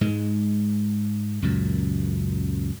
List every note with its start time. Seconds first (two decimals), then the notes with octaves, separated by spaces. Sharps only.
0.01 G#2 G#3
1.42 C#2 F#2 A#2